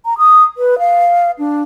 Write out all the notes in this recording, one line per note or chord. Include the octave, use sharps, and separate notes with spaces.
A#5
D#6
B4
F5
D4